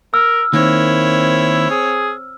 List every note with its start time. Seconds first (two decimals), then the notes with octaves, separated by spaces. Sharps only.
0.14 A#4 E6 F6
0.53 D#3 A#3 C4 E4 C#5
1.70 G#4